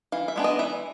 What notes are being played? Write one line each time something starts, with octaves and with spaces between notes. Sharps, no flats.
E3 F5
E5
G#3 B3 D4
D#5
E3 E5